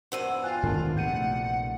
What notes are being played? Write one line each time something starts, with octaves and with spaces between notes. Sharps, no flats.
E2 G2 C5 F#5 E6 D#7
F4 G5 G#5 F#6
G#2 D#3 D4 A#4 A5
A#1 C3 A3 F#5 G6 D#7